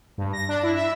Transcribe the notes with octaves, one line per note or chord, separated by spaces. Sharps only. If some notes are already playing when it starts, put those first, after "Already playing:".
G2
A#6
D4
E4
E5